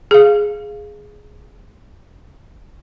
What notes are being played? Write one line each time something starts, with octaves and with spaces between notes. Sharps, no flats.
G#4 F5